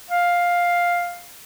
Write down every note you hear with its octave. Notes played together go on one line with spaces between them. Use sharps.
F5